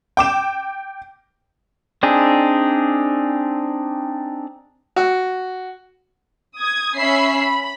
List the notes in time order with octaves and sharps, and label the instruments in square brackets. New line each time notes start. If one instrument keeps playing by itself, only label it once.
[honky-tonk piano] G5 D6 E7
[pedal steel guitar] C4 D4 D#4 G#4
[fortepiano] F#4
[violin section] D#6 G#6
C#4 E5 B5 E6 C7
B5